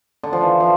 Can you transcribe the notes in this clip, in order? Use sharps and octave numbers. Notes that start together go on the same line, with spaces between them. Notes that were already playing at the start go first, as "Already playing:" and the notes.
D3
F3
E3
F3